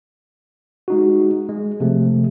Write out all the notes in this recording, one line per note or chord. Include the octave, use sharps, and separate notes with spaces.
G#3 D#4 F#4
G#3
C3 F3 A3